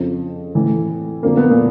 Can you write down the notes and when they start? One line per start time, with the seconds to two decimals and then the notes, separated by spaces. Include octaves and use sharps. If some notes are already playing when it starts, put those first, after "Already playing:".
Already playing: F2 C#3 F3
0.55 A2 E3
1.22 F2 D3 F3 A#3
1.37 B3
1.50 A#2 A#3